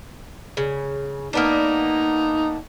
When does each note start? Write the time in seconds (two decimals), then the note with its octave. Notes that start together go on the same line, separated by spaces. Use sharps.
0.57 C#3
1.33 A#3 B3 D4 D#4